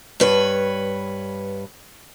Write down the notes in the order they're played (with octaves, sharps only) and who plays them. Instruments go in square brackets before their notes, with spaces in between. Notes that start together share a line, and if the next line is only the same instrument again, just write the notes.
[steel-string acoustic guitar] G2 B4 C#5